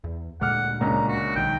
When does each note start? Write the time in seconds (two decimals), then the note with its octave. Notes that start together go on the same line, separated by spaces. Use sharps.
0.04 E2
0.41 D2 A#2 G#3 F#5 D6 F6
0.81 C#2 A#3 C#4 D4 A#5
1.08 F#4
1.36 B1 D#3 G5